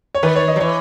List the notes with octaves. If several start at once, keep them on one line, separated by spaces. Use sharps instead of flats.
C#5
D#3 B4
C#5
D#5
F#3
E3 C#5